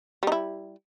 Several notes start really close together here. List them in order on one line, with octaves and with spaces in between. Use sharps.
G3 D#4 E4